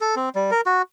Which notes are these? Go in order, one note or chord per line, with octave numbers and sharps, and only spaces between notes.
A4
C4
G3
A#4
F#4